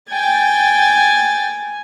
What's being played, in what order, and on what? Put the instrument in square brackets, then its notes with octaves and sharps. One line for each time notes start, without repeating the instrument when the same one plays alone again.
[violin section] G5 A6 [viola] G#5